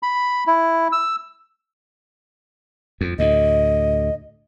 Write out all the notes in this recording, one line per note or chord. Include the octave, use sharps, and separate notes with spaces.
B5
E4
E6
F2
D2 A2 D#5